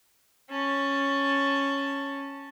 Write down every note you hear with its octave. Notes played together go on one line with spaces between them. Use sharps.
C#4 A5